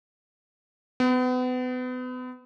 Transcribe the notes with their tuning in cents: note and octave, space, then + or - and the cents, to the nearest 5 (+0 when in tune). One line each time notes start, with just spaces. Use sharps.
B3 +35